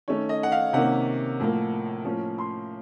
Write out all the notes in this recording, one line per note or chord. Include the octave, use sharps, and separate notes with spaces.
D#3 A3 C#4 C#5
D#5
F#5
F5
C3 D#3 A#3 C#4 F#5
A2 F3 A#3
A2 F3 A#3 C#4
C6